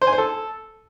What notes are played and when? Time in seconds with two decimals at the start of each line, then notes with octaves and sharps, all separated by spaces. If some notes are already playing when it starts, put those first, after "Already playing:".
0.02 C5
0.07 G#5
0.13 C5
0.18 A4